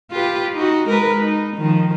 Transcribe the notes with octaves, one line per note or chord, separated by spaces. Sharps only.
F4 G4 B4
D#4 F#4
G#3 A#4 B4
D#4
D#3 F3